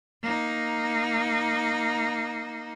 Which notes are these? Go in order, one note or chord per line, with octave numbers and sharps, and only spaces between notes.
A#3 D#4